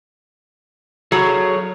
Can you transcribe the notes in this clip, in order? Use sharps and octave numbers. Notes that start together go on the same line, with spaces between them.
F#3 G#4 A4 C#5